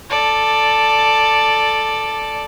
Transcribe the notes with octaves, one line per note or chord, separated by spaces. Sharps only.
A4 D5